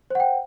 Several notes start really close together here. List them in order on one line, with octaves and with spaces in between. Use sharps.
C5 F#5 G5